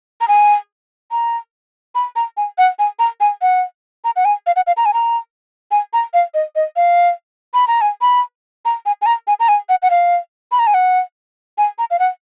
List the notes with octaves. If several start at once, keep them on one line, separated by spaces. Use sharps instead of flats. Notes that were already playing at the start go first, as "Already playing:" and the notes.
A#5
G#5
A#5
B5
A#5
G#5
F#5
G#5
A#5
G#5
F#5
A#5
F#5
G#5
F5
F#5
F5
A#5
G#5
A#5
G#5
A#5
F5
D#5
D#5
F5
B5
A#5
G#5
B5
A#5
G#5
G#5
A#5
G#5
A#5
G#5
F#5
F#5
F5
B5
A#5
G#5
F#5
G#5
A#5
F5
F#5